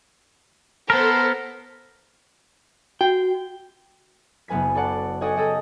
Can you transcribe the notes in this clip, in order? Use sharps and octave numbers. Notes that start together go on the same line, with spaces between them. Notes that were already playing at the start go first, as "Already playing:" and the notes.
B3 A4 A#4 C5
F#4 G5
F#1 B3 B4 G#5 B6
A4 C#5 D5 F#5 A5
G4 A4 C#5 D#5 F#5 G#5
G#4 A4 D#5 G5